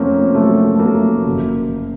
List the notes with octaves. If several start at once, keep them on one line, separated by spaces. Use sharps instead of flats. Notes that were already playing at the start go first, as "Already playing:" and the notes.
Already playing: F2 A3 A#3 C4 C#4
F#3 A3
A3
F#3 A#3
F#1